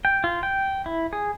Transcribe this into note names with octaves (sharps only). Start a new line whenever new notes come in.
G5
F4
G5
E4
G#4